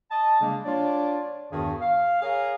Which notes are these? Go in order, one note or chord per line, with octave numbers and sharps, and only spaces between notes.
D#5 A5
C#3 G3 G#3 A#3 D4
D4 F4 C#5 D5
E2 G2 D#3 F#4 G#4
F5
G#4 A#4 C#5 F5